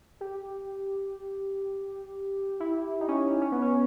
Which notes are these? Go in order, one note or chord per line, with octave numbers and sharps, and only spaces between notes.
G4
E4
D#4
C#4
D#4
C#4
B3
C#4